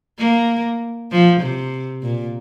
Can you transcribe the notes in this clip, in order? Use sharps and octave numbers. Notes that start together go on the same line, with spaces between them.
A#3
F3
C3
A#2